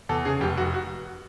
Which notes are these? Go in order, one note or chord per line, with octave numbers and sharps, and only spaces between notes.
E2 A4
C#3 G#4
F1 G4
F1 F#4
F#4